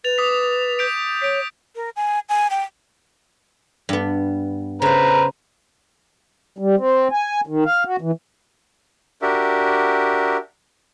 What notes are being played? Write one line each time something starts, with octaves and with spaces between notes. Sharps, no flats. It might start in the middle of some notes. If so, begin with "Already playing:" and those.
B4 A6 F7
D6 D#6 B6
G6 B6 D7
C#5 B6 D7
A#4
G#5
G#5
G5
G2 B3
C#3 B4 C5 F5 A#5
G3
C4
G#5
D#3
F5
F#4
E3
D4 F#4 G4 A#4 E5